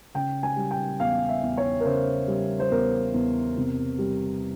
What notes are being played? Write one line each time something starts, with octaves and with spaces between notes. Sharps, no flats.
C#3 G5
G#5
G3
G5
E2 F5
E5
E2
C#5
A#4
C#3 C5
G3
C5
E2 A#4
E2
C3
G3